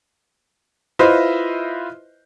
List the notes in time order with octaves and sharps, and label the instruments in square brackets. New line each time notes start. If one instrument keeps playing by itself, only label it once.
[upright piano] E4 F4 B4 C5 D#5 E5